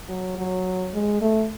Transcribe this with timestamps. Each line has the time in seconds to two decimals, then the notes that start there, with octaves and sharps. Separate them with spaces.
0.09 F#3
0.38 F#3
0.94 G#3
1.22 A3